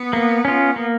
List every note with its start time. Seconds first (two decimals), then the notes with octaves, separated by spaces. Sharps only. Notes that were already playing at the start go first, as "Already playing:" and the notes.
Already playing: B3
0.13 A#3
0.45 C#4 F4
0.76 A#3